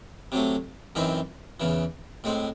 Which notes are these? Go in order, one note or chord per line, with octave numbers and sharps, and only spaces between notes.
C3 F#3 A3
F#2 E3 C4 D#4
E2 C#3 E3
A2 G#3 C4